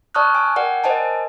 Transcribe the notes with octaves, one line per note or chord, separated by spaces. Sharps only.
D5 A5 C#6 D#6 F6 F#6
G#5
A#4 D5 F#5 G5
A#4 C5 D#5 G#5 A5